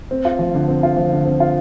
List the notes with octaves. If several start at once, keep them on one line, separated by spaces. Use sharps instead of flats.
C4
F4
F3
D3
C4
F4
F3
D3
C4
F4